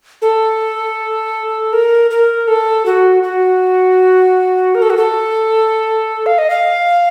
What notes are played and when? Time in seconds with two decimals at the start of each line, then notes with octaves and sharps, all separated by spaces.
0.22 A4
1.73 A#4
2.11 A#4
2.48 A4
2.86 F#4
3.23 F#4
4.75 A#4
4.82 A4
4.90 F#4
4.97 A4
6.26 F5
6.38 D#5
6.50 F5